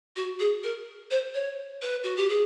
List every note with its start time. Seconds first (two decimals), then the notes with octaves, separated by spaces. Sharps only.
0.16 F#4
0.40 G#4
0.64 A#4
1.11 C5
1.34 C#5
1.82 B4
2.04 F#4
2.17 G4
2.29 G#4